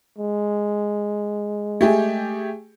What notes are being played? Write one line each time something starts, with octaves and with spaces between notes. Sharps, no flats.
G#3
A3 G4 G#4